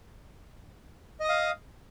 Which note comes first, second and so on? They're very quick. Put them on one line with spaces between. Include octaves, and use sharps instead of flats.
D#5 D#6 F5